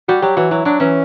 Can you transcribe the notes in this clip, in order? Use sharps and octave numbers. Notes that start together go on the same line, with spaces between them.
G3 F#4
F#3 G4
E3 F#4
F#3 E4
F#3 D4
E3 C#4